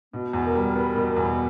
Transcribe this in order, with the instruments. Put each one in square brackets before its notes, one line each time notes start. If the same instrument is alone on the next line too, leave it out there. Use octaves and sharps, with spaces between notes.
[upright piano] B2 [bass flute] B3
[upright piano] E2
[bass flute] A#4
[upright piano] G3
B3
B2
E2